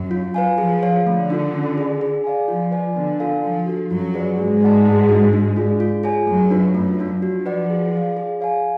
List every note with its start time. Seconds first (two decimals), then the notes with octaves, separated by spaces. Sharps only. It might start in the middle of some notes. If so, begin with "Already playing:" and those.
Already playing: F#2 F#3
0.11 F4
0.34 B4 F5 G#5
0.58 F3 G#4
0.83 C#5 F5
1.05 D3 A3
1.30 D4 F4 A4
1.54 C#4
1.78 G#4 D5
2.01 G#4
2.24 D5 F5 G#5
2.48 F3 F4
2.71 B4 D5 G#5
2.96 D3 B3
3.19 F4 A4 F5 G#5
3.43 F3 D4
3.66 F#4 A4
3.90 F#2 F#3 F4
4.14 G#4 B4 D5
4.37 G#2 G#3 F#4
4.61 B4 D5 F#5 A5
4.85 A3
5.09 D4 F#4
5.33 D4
5.56 F4 G#4 D5
5.80 F4
6.03 G#4 C#5 G#5
6.27 F#2 F#3 A3
6.51 D4 F4 B4
6.74 F#2 F#3 A3
6.99 D4 F4
7.22 F3 F#4
7.46 B4 D5 F#5
7.70 G#4
7.94 D5 F5
8.17 G#4
8.40 C#5 F5 G#5